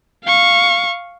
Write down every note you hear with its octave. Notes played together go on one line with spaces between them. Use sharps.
F5 C#6